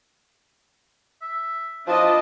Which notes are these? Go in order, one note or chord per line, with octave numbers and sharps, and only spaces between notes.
E5
F3 D4 E4 D#5 A5